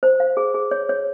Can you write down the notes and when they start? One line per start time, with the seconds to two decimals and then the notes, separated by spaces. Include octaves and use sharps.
0.03 C5
0.20 F5
0.37 G#4
0.54 G#4
0.71 C#5
0.89 C#5